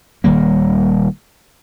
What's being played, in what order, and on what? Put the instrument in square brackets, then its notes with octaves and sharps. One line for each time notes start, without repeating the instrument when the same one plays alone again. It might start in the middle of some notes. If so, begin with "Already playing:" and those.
[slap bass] D#1 D#3 G3 A#3